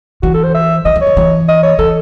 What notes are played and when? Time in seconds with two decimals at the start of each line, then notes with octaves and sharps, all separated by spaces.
0.23 E3 F#4
0.34 A4
0.44 C5
0.54 E5
0.85 E3 D#5
0.96 E3
1.01 C#5
1.06 E3
1.17 E3
1.48 D#5
1.63 C#5
1.79 E3 A4